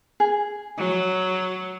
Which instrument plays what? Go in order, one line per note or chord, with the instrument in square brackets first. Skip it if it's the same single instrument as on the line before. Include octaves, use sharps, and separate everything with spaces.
[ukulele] G#4
[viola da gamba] F#3